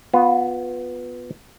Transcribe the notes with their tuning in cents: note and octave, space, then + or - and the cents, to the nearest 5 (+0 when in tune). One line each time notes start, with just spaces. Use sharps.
B3 +0 F4 +30